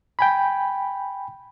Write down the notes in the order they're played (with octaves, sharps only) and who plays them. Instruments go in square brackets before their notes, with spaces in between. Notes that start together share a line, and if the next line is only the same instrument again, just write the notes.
[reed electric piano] G5 G#5 B5